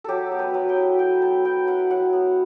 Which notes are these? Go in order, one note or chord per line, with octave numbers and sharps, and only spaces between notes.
F#3 G4 A4
B3
B4
F#3
G5
E4
F#3 G5
B3 A5
F#3 G5
E4 F#5
F#3 F#5
B3